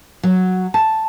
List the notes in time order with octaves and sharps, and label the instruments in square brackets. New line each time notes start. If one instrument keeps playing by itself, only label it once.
[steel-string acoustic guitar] F#3
A5